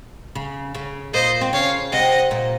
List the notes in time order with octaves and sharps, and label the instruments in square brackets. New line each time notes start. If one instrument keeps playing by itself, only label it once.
[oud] C#3
C#3
[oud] A#2 A#3 [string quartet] C5 D#5
[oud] C4
[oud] C#3 C#4 [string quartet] C#5 F5
[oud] C3 C4 [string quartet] D#5 F#5
[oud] A#2 A#3